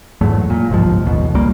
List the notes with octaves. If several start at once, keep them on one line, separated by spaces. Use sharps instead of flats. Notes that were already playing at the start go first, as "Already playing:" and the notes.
E2 G#2 F#3 A3
A#2
G1 C2 G#2 F3
A1 D#2 B2
C#2 G3 A#3